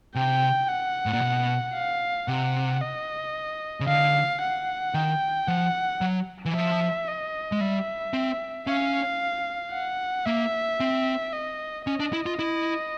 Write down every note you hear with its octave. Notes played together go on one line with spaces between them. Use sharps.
C3 G5
F#5
A2
A#2
B2
F5
C3 F#5
D#5
C#3
D3 F5
F#5
D#3 G5
F3 F#5
F#3
E3
F3 E5
D#5
G#3
G3 E5
C4
C#4 F5
F#5
A#3 E5
C4
D#5
C#4 D#5
D4
E4
F4
E4